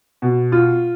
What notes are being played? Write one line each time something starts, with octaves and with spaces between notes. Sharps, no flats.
B2
F4